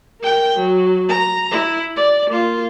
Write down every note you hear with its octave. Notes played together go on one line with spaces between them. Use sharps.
A#4 G5
F#3
A#5
E4
D5
A#3 F4